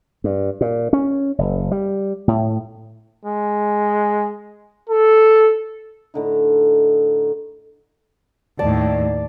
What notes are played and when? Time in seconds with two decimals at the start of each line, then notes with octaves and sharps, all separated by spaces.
0.24 G2
0.61 A#2
0.93 C#4
1.38 F#1
1.72 G3
2.28 A2
3.26 G#3
4.89 A4
6.14 A2 D3 D#4
8.59 D#2 A2 D5 A5